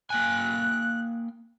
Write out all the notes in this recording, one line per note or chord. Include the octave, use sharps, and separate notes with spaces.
A#3 G5 G#5 F#6